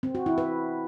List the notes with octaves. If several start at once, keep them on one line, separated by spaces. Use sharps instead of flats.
C4
F#4
E4
B4